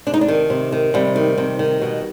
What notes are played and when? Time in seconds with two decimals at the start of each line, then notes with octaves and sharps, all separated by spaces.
0.06 C3 D4
0.14 D#4
0.21 D4
0.28 D#3
0.50 C3
0.72 D#3
0.94 C3 G3
1.16 D#3
1.38 C3
1.59 D#3
1.81 B2